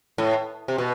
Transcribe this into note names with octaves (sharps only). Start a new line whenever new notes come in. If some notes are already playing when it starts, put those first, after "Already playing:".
A2
C3
B2